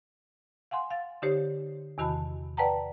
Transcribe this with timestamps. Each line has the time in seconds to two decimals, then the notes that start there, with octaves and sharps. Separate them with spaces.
0.71 F5 F#5 G#5 C6
0.91 F5 A6
1.22 D3 D#4 G4 C5 C#5
1.98 E2 C3 D#3 F#4 A5 B5
2.57 B4 D5 F#5 G5 A5 A#5